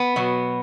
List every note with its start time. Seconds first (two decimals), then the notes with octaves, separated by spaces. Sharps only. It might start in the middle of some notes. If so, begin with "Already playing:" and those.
Already playing: B3
0.16 B2 F#3